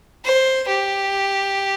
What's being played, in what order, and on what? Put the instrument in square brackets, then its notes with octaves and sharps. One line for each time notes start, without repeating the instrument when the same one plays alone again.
[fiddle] C5
G4